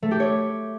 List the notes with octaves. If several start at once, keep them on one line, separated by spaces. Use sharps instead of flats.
A3
G4
C#5